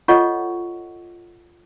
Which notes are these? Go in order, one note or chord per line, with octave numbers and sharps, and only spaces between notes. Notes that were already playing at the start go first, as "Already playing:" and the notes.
F4 A4 C#5 D#5 F#5 C#6